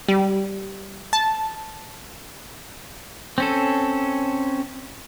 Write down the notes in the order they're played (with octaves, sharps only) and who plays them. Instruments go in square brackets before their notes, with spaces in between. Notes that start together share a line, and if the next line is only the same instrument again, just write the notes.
[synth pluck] G3
A5
[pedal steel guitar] C4 C#4 A4